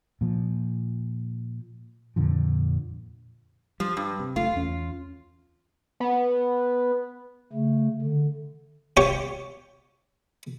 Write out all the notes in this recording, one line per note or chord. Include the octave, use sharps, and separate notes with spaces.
A#2 F3
F2 A#2 D3 F3
F3 G3
G2
C3
F#1 A3 F4
E2 C#4
B3
C#3 A3
D3
G4 C#5 C#6